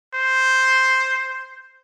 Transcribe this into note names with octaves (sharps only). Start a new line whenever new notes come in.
C5